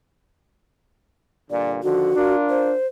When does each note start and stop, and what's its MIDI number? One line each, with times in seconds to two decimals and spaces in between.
1.51 1.82 43
1.51 1.82 46
1.51 1.82 50
1.51 1.71 74
1.83 2.16 50
1.83 2.16 51
1.83 2.16 53
1.83 2.34 66
2.16 2.74 62
2.16 2.74 65
2.16 2.74 70
2.50 2.87 72